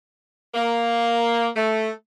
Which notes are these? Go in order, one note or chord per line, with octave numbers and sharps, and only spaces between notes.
A#3
A3